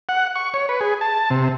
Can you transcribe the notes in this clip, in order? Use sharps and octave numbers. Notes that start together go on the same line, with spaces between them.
F#5
C#6
C#5
B4
G#4
A5
C3